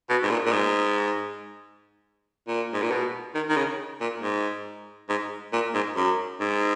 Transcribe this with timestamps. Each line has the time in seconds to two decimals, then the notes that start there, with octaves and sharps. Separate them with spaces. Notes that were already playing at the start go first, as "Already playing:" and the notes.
0.10 B2
0.23 G#2
0.30 A#2
0.46 A#2
0.52 G#2
2.48 A#2
2.73 G#2
2.82 A#2
2.91 B2
3.35 D#3
3.50 D#3
3.57 C#3
4.01 A#2
4.22 G#2
5.09 G#2
5.53 A#2
5.74 G#2
5.96 F#2
6.40 G#2